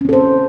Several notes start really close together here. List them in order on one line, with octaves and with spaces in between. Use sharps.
C#4 C4 A4 C5